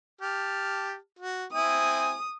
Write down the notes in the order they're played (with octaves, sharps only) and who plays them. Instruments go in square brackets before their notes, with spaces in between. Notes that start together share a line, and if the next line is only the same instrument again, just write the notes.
[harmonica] G4 A5 F6
F#4
[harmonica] C4 E4 G#5 [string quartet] D#6